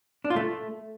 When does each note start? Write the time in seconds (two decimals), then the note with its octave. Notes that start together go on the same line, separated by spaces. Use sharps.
0.24 D4
0.30 F4
0.36 A3